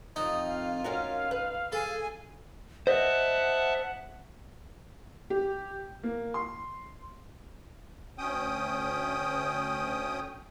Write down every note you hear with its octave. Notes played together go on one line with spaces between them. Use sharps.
F2 D#4 F4 D#6
F5
C#4 F#4 A#4 F5
B4
G#4 A4 G#5
C5 D#5 E5 F#5 A5
G4
A#3
C6
D2 C#4 G5 D#6